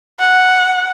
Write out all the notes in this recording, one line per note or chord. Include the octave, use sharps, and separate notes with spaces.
F#5